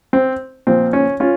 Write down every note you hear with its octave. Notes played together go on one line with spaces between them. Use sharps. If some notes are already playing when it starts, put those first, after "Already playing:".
C4
A#2 F3 C4
C#4
C#4 F4